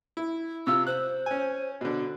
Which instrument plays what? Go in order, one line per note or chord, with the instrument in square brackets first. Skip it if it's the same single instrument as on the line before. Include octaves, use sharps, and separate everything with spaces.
[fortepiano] E4
[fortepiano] C3 F4 [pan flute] E6
[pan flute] C5 [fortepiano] F#6
[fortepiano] C#4 G#5
B2 D3